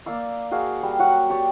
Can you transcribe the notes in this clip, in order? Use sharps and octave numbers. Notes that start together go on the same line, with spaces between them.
A#3 D5 F5 E6
F#4 G#4 A#4 F5
G3
F#3 F#4 F#5
G4 C#5 D5